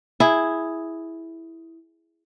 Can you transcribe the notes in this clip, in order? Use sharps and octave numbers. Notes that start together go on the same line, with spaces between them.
E4 G#4